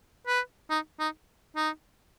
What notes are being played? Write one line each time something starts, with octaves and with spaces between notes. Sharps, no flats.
B4
D#4
D#4
D#4